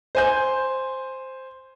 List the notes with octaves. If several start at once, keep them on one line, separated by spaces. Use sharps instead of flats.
C5 G#5 G6